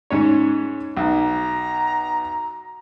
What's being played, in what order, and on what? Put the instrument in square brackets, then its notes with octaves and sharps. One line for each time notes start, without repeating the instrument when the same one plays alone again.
[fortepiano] G#2 C#4 C#5
[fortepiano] B1 [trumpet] A#5